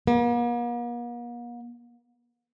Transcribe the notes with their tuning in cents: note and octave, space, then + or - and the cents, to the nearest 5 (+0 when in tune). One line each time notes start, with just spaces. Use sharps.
A#3 +45